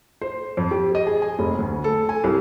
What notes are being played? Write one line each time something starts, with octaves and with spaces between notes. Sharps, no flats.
C5
F2
G4
D#5
G#4
G#5
F1
D2
A4
G#5
C2